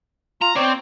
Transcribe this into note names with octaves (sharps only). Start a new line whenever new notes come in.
F4 A#5
C4 C#5 D5